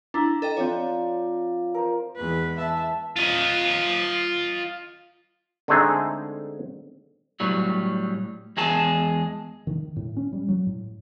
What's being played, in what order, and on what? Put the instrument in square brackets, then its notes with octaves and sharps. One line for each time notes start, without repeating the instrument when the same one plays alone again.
[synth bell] D4 E4 [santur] A#5
[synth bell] A4 D#5 G5
[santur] F3 D5 F5 [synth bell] C4 C#5
[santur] A#4 C5
[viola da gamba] E2 G#3 B4
[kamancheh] E5 A5
[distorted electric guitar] F4 D#5
[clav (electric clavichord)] D3 G#3 A3 C4 D#4 G#4
[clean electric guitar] A2 F#3 G3
E2 G#3 G#4 A5
[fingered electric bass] D#3
A2
C#4
G3
F#3
A2